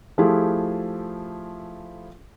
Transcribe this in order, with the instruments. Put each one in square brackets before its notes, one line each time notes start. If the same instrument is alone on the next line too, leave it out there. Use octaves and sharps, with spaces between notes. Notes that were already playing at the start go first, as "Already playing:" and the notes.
[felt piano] F3 A3 E4 F4 G4 G#4